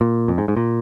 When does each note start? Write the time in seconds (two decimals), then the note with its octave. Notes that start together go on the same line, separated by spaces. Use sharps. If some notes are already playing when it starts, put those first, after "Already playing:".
0.01 A#2
0.28 F2
0.38 G#2
0.48 G#2
0.57 A#2